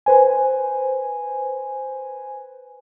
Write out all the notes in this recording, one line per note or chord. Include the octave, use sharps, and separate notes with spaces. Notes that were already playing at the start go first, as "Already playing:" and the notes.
B4 C5 G#5